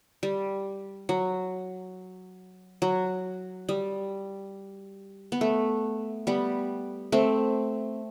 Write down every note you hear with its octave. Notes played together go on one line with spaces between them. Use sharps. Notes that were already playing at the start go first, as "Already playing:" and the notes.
G3
F#3
F#3
G3
B3
A3
G3 B3
A3 C4